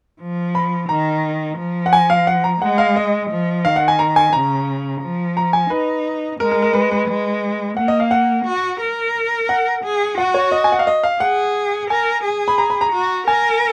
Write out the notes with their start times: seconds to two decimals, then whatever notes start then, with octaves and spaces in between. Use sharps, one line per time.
0.21 F3
0.55 B5
0.89 D#3 A#5
1.58 F3
1.86 F#5
1.93 G#5
2.10 F5
2.27 F#5
2.44 A#5
2.61 G#3 F#5
2.78 F5
2.96 D#5
3.31 F3
3.65 D#3 F5
3.76 F#5
3.88 G#5
3.99 A#5
4.16 G#5
4.33 C#3 A#5
5.02 F3
5.37 A#5
5.53 G#5
5.70 D#4 B4
6.40 G#3 A#4
6.51 A#4
6.62 A#4
6.73 B4
6.92 B4
7.08 G#3
7.77 A#3 F#5
7.88 D#5
8.00 F5
8.11 F#5
8.45 F#4
8.81 A#4
9.49 F#5
9.84 G#4
10.18 F#4 F#5
10.34 C#5
10.52 D#5
10.64 G#5
10.72 F#5
10.79 F5
10.87 D#5
11.04 F5
11.20 G#4 F#5
11.90 A#4 G#5
12.24 G#4
12.48 B5
12.58 A#5
12.70 B5
12.81 A#5
12.92 F#4
13.27 A#4 G#5